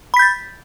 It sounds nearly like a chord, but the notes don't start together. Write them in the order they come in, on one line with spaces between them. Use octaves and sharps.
B5 B6 G6 A6